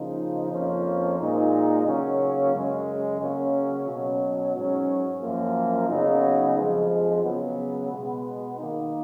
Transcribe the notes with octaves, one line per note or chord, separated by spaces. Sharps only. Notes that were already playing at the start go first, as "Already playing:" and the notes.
Already playing: C#3 F3 A#3 D#4
F2 F3 A#3 C#4
A#2 G#3 D#4
C#3 F#3 A#3 C#4
F#2 C#3 G#3
C#3 F#3 A#3 C#4
B2 F#3 C#4
G#2 F#3 C#4
F#2 F3 A#3
C#3 F#3 B3 D#4
F2 F3 G#3
C#3 F#3 B3
B2 G#3 B3
D#3 A#3 D#4